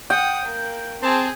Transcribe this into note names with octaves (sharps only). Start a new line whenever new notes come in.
F#5 G5 D#6
A#3
C4 G#4 A5